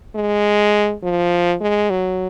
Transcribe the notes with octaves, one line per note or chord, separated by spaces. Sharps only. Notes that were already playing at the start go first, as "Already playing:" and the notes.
G#3
F3
G#3
F#3